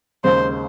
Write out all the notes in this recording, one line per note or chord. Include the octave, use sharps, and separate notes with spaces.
D#2 C#3 G#3 C5